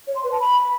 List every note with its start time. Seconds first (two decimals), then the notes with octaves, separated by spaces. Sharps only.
0.07 C#5
0.16 C6
0.24 B4
0.32 A5
0.40 B5